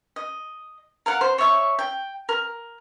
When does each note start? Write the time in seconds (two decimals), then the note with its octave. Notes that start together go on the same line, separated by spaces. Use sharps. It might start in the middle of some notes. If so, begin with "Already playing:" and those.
0.16 D#5
1.06 A#4 F5 F#5
1.21 C5
1.38 C#5 D5 E5 C#6
1.79 G5
2.29 A#4